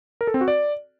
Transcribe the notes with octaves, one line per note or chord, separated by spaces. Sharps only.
A#4
A4
C4
F#4
D5